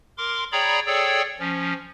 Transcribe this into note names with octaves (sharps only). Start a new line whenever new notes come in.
A#4 C6 D6
G#4 C#5 D5 G5 A#5 B5
G#4 A4 C#5 D5 G5 E6
F3 C#4